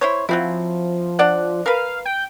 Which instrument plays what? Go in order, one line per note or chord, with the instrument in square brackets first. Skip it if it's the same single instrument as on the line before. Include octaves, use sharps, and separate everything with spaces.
[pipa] E4 C5 C#5
[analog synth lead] F3 [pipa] F#3 C4 E4
[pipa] D4 D5 F#5
[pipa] A#4 B4 [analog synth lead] F5
[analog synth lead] G5